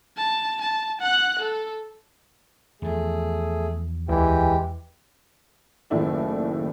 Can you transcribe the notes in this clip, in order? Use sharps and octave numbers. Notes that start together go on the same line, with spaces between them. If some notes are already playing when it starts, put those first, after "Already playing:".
A5
A5
F#5 F#6
A4
E2 F3 A3 G#4
D2 E3 G#3 G4 G5
F#1 D#2 A2 A3 E4 D5